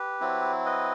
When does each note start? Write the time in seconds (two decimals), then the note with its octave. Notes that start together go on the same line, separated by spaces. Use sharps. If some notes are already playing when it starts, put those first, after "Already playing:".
Already playing: G4 B4
0.21 F#3 C4 E4
0.65 B4 D#5